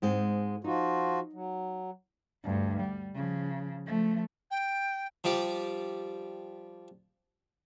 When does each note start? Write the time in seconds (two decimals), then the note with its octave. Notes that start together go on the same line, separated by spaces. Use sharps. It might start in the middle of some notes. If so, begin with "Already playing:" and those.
0.02 G#2 G#3 C4
0.64 F3 D#4 F4 F#4
1.33 F#3
2.44 D2 G2
2.80 G3
3.15 C#3 F3
3.87 F3 A3
4.51 G5
5.24 F3 G3 G4 D5